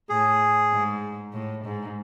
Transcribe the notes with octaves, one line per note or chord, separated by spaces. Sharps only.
A2 G#4
G#2
A2
G#2